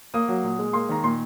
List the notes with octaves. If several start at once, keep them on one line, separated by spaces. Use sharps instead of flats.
A#3 D#6
F#3
A#2
G#3
A#3 C6
D#3 A#5
A#2 C6